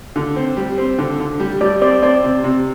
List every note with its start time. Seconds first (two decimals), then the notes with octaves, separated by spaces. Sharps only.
0.16 D3
0.36 C4
0.57 G3
0.78 C4
0.98 D3
1.20 D3
1.40 G3
1.61 G3 D5
1.81 C4 D5
2.02 C4 D5
2.24 C3
2.44 C3